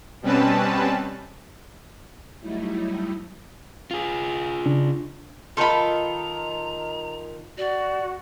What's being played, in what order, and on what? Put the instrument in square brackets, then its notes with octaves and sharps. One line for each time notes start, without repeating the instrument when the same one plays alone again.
[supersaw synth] B2 G3 C4 C#4 B4 A5
[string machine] F#3 G3 A3 D#4 E4
[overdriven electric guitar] F4 G#4
[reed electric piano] C#3 D4
[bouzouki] D#3 F4 [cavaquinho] A4 B5 [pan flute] A#5
[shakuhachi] F#4 [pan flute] D5